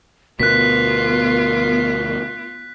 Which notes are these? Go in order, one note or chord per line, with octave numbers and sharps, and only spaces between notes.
D2 B2 B3 F4 A#4 F#6 B6